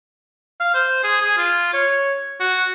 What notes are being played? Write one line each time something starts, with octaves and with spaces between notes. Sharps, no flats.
F5
C5
G#4
G#4
F4
C#5
F#4